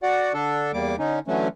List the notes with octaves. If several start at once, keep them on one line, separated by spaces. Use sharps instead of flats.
F#4 D5 F#5
D3 D4 A4
E2 G3 A#3 D6
D3 C#4 D#4
D3 E3 F#3 A3 C#4